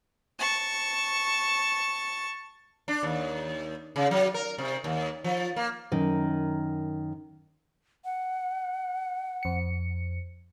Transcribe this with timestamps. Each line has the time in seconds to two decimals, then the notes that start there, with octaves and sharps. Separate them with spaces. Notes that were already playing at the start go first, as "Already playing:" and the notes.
0.39 A5 C#6
2.88 D4
3.03 D#2
3.96 C#3
4.11 F#3
4.34 A#4
4.58 C3
4.84 D#2
5.24 F3
5.56 A#3
5.92 F#2 D#3
8.05 F#5
9.43 F2 C#7